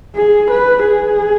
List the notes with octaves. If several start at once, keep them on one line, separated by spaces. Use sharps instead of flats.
G#4
B4
G#4